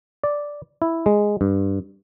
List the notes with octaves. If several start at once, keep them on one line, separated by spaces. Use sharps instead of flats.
D5
E4
G#3
G2